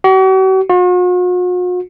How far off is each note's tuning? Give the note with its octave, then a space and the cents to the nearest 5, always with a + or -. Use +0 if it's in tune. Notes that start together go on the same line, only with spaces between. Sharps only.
F#4 +45
F#4 -45